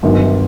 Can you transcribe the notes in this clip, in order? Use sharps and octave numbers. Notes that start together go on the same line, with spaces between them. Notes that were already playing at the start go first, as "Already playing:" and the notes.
G1 F#2 D#3